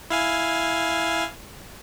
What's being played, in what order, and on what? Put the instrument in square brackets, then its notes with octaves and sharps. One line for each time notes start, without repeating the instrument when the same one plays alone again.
[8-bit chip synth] E4 F5 G#5